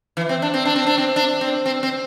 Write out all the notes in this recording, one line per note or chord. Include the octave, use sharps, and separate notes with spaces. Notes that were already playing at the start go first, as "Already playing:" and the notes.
E3
C4
D4
C4
D4
C4
D4
C4
D4
C4
C4
C4